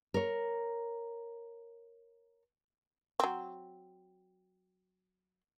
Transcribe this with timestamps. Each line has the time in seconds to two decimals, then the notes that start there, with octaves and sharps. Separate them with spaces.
0.14 A#4 C#5
3.20 F#3 C4